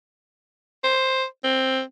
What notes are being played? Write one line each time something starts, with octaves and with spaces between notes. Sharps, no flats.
C5
C4